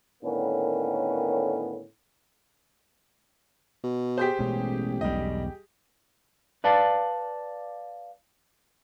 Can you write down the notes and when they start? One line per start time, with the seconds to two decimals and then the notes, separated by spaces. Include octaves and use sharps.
0.24 A2 D3 D#3 A#3 B3 C#4
3.83 B2
4.18 G4 G#4 C5 G6 B6
4.39 A1 B2 G#3 C#4
5.01 E1 B1 G3 D#5
6.64 B4 D5 F5 A5